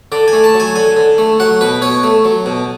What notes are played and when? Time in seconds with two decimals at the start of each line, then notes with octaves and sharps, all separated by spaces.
0.12 D3 D5
0.28 G#5
0.33 A3
0.44 A5
0.54 F#3
0.60 G#5
0.76 D3 G#5
0.97 D3
1.18 A3
1.40 F#3 F#5
1.61 B2 B4
1.82 B2 C#5
2.04 A3
2.25 F#3
2.46 B2